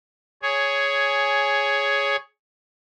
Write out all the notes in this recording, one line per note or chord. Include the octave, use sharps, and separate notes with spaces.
G#4 C#5